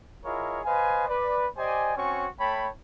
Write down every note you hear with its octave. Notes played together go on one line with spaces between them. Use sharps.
E4 F4 G#4 A#4 C#5 D#5
B4 C5 D#5 F5 G#5
B4 D5
G4 C5 D5 D#5 G#5
C4 C#4 F#4 C#5 G#5 C#6
A3 C#5 G5 A5 B5